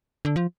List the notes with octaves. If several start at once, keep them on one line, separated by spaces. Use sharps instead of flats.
D3
F3